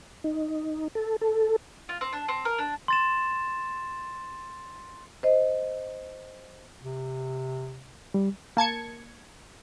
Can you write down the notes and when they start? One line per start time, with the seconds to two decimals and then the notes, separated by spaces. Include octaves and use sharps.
0.24 D#4
0.95 A4
1.21 A4
1.89 F4
2.01 C4
2.13 D4
2.28 C4
2.45 A#4
2.58 D4
2.88 C6 A6 E7
5.23 C5 D#5
6.83 C3
8.14 G3
8.57 A#3 A5 G#6 C#7